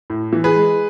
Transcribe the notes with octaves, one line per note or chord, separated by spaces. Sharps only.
A2
E3
G#4 B4
G#3